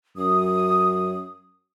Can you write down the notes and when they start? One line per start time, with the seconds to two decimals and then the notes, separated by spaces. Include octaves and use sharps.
0.17 F#2 D#6